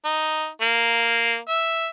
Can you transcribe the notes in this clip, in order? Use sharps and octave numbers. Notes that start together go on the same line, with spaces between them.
D#4
A#3
E5